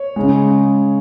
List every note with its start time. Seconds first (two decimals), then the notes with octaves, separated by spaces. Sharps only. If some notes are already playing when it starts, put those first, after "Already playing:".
Already playing: C#5
0.16 C#3 G#3